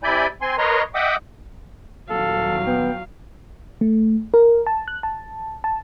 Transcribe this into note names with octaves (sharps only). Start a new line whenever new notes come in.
C3 E4 D5 G#5 B5 G6
C4 G#5 C6
A#4 B4 C#5 D#5 A#5 C6
D#5 E5 F#5 G5 D6 D#6
D#1 F#3 A4 F5
B3 G5
A3
A#4
A5
F#6
A5
A5